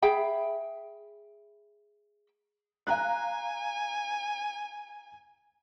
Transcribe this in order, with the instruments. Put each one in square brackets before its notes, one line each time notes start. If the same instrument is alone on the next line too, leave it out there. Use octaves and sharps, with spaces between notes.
[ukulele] G#4 E5 G5 B5
[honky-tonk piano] F5 A#5 F#6 [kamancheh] G#5